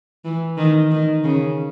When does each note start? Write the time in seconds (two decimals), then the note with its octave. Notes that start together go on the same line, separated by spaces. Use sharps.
0.25 E3
0.57 D#3
0.91 D#3
1.24 C#3